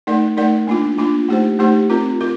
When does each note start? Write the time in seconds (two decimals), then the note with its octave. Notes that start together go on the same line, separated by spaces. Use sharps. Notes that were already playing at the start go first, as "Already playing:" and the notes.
0.07 A3 D#4 A#4 D5
0.37 A3 D#4 A#4 D5
0.67 A#3 D4 F4
0.98 A#3 D4 F4
1.29 A3 D#4 G4 C5
1.59 A3 D#4 G4 C5
1.90 C4 F4 A#4
2.21 F4 A#4